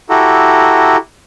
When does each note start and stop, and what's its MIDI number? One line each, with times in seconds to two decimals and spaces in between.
0.10 0.97 64
0.10 0.97 66
0.10 0.97 67
0.10 0.97 69
0.10 0.97 82